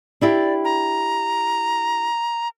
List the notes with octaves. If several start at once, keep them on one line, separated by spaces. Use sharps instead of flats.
D4 E4 G4 D5
A#5